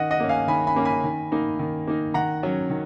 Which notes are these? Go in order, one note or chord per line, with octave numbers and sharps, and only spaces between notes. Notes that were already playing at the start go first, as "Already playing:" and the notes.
Already playing: D#3 D#5 F#5
D#5 F#5
A#3 C#4
F5 G#5
D#3 G#5 B5
G#5 B5
A#3 C#4
G#5 B5
D#3
A#3 D#4
D#3
A#3 D#4
D#3 F#5 A#5
F#3 C#4
D#3